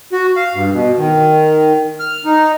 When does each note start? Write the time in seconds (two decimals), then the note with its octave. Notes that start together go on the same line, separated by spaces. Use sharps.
0.12 F#4
0.36 F5
0.55 G2
0.73 B2
0.98 D#3
2.00 F6
2.25 D#4